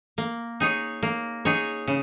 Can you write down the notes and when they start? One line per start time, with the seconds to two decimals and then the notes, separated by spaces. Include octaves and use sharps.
0.18 A#3
0.60 D#4 G#4 C#5
1.03 A#3
1.45 D#4 G#4 C#5
1.88 C#3